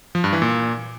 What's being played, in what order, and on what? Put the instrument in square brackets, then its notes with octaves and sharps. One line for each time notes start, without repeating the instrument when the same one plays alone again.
[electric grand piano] F3
G2
E3
A#2